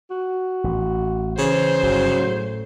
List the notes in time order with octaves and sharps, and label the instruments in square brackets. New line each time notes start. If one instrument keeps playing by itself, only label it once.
[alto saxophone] F#4
[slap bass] A1
[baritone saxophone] C#3 [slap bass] E3 [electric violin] C5
[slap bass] G1 [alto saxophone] F#3
[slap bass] A2